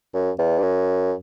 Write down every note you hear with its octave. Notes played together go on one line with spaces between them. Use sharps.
F#2
E2
G2
F#2